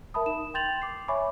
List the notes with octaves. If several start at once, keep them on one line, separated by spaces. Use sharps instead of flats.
A#4 E5 A5 B5 D#6
D#4 E7
G5 C6 G6 A6 F7 F#7
D6 C7
C#5 E5 G#5 B5 C#6 D6